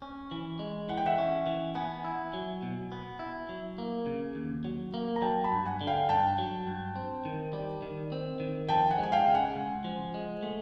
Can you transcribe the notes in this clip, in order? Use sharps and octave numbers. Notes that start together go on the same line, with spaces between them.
C#4
E3
G#3
E3 F#5
G5
E5 F#5
C#4
E3
B3 F#5 G#5
E4
F#3
B2
B3
E4
F#3
A#3
C#3
D#2
F#3
A#3
A#5
F#3 G5 A5
A5 B5
G2
F#5 G#5
D3
F5 G5
G2 G5 A5
F#3
G2
C4
D#3
G3
D#3
C4
D#3
F3 G5 A5
F#5 G#5
G#3
G#5
F5 G5
C#3
F#5 G#5
C#2
F3
G#3
A3